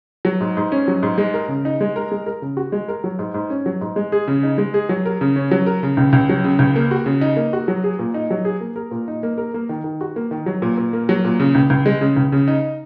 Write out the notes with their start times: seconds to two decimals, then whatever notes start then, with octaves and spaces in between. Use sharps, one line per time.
0.25 F#3
0.40 G#2
0.57 G#2
0.72 C#4
0.88 F#3
1.03 G#2
1.18 G#3
1.34 A#4
1.48 C#3
1.65 D#4
1.81 G#3
1.96 A#4
2.12 G#3
2.26 A#4
2.42 C#3
2.57 F#4
2.72 G#3
2.88 A#4
3.04 F#3
3.19 G#2
3.34 G#2
3.50 C#4
3.66 F#3
3.81 G#2
3.96 G#3
4.12 G#4
4.28 C#3
4.43 D#4
4.58 G#3
4.74 G#4
4.89 F#3
5.06 A#4
5.21 C#3
5.36 C#4
5.51 F#3
5.66 A#4
5.83 C#3
5.97 C#2
6.13 C#2
6.29 F#3
6.44 C#3
6.59 C#2
6.76 A#3
6.91 F#4
7.06 C#3
7.21 D#4
7.36 A#3
7.53 F#4
7.68 F#3
7.84 G#4
7.99 A#2
8.14 D#4
8.30 F#3
8.45 G#4
8.61 A#3
8.76 A#4
8.91 A#2
9.08 D#4
9.23 A#3
9.38 A#4
9.54 A#3
9.69 D#3
9.84 D#3
10.01 F#4
10.16 A#3
10.31 D#3
10.46 F#3
10.62 A#2
10.78 A#2
10.93 A#3
11.09 F#3
11.24 A#2
11.40 C#3
11.55 C#2
11.70 C#2
11.86 G#3
12.01 C#3
12.16 C#2
12.32 C#3
12.48 D#4